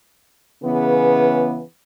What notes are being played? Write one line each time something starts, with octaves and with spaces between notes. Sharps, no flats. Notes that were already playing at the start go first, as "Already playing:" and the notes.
C#3 E3 B3